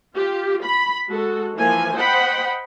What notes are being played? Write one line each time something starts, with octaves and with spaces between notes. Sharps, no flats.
F4 G4
B5
G#3 F#4 A4
E3 F3 A#3 G#5
C5 D#5 F#5 G5 B5